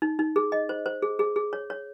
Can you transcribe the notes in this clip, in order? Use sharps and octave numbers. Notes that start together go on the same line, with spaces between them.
D#4
D#4
G#4
D#5
C5
C5
G#4
G#4
G#4
C#5
C#5